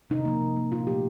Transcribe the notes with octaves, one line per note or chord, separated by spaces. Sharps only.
C3 D#4
F3 A#3
C3
F3 A#3
A#2 F4
F3 A3 G4